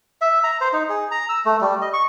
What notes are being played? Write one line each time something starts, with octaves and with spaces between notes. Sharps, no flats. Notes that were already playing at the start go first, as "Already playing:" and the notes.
E5
A#5
C5
D#4
G#4
A#5
E6
A3
G3
D#5
C#6